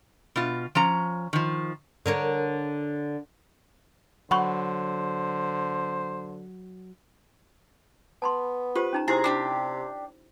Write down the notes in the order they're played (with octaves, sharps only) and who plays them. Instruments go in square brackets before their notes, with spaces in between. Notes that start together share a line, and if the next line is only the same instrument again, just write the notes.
[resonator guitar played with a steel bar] B2 F4
F3 C#4 A#5
D#3 F3
[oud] D3 A#4 C#5
[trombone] D3 [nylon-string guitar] F#3 [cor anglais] C5 [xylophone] F#5 B5 C#6
[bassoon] B3 [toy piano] A5 B5 C6
[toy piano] F4 G4 C5 [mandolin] B4
[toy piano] C#4 D#4 A#5
[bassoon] C3 [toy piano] E4 G4 C5 [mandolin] G#4 A#5
[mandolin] D4 F#4 G4 [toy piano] B5